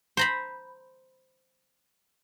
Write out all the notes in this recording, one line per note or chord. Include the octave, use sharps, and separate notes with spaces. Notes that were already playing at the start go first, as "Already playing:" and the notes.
C5 A#5 B5